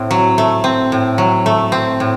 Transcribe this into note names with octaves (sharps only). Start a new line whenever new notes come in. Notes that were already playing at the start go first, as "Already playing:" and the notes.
Already playing: A2 C4
F#3
A3
C4
A2
F#3
A3
C4
A2